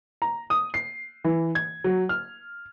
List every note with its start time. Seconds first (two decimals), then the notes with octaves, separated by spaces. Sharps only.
0.22 A#5
0.50 D#6
0.74 C7
1.24 E3
1.55 G#6
1.84 F#3
2.09 F6